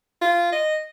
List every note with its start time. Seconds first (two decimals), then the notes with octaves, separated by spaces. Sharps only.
0.22 F4
0.52 D#5